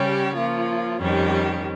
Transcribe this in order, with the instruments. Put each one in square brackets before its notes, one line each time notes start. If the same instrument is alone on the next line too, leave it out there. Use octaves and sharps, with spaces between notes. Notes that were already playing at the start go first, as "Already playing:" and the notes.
Already playing: [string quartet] C#3 G3 C#4 G4 [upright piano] C#5
[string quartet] F3 A#3 F4
F2 D#3 G3 C#4 G4